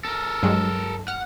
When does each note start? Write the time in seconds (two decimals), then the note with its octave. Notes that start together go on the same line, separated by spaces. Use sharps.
0.05 A4 A#4
0.43 G2 F#3 G#3
1.08 F#5 F6